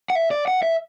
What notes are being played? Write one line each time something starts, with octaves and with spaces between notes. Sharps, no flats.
F#5
E5
D5
F#5
E5